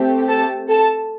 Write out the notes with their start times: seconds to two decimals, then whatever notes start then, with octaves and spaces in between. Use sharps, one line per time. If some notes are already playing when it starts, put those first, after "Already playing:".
Already playing: A3 C4 G4
0.28 A4 A5
0.69 A4 A5